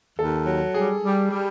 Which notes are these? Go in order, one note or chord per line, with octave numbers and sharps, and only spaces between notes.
D#2 A4
F#3
G3 G#4
G3
G3